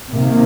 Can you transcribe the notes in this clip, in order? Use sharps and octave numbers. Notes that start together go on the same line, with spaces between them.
C3 D#3 A#3